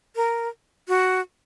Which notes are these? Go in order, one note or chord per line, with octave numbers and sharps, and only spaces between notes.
A#4
F#4